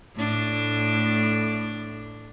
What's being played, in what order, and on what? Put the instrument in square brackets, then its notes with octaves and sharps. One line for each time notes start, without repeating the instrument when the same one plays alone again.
[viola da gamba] A2 A3 D4